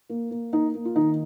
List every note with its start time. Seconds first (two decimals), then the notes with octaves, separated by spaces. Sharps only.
0.10 A#3
0.31 A#3
0.53 A#3 D#4
0.74 A#3
0.85 F4
0.96 D#3 D#4